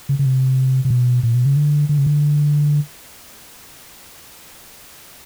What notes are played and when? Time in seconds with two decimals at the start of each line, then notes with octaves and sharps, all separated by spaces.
0.09 C#3
0.19 C#3
0.26 C3
0.85 C3
0.90 B2
1.23 A#2
1.35 B2
1.46 C#3
1.56 D3
1.89 D3
1.98 C#3
2.06 D3